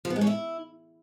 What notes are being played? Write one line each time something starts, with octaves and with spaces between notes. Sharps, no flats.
F3
B3
G#3
C#4
E4